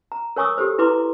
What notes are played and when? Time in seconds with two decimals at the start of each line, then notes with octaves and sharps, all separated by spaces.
0.12 A#5
0.36 A#4 C#5 G#5 C#6 D#6 E6
0.58 G4 A4 C5
0.79 E4 B4 A#5 C6 D6